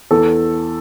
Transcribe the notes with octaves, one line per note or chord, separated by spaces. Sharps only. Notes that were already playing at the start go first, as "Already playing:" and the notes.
E2 A4